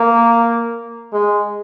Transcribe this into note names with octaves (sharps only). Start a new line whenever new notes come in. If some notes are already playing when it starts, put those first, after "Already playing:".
Already playing: A#3
G#3